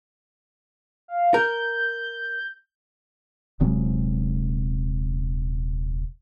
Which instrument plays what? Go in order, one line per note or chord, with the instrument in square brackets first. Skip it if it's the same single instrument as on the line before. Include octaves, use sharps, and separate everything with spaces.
[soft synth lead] F5
[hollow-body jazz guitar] A#4 [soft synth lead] G6
[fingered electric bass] D#1 C3 F#3 G#3